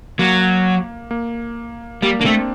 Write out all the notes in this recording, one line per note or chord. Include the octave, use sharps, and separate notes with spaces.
F#3 A#3
A#3
G3 A#3
A#3 D4
A3 C4